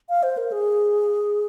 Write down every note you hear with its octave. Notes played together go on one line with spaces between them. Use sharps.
F5
C5
A#4
G#4